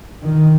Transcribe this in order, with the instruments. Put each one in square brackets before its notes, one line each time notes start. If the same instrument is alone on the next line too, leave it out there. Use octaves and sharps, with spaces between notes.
[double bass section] D#3